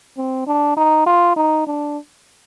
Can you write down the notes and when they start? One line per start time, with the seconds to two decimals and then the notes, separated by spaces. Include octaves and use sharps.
0.18 C4
0.47 D4
0.77 D#4
1.07 F4
1.36 D#4
1.67 D4